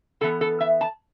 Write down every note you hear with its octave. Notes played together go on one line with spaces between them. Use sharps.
A2 E3 B3 A4
A4
E5
A5